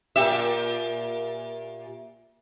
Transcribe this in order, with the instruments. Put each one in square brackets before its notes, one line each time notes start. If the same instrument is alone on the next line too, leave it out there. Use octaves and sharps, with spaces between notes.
[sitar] A#2 G4 E5